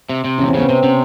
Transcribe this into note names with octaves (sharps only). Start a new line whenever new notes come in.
C3
C3
E2 C#4
C4
C#3 B3
C3 C4
C3 C#4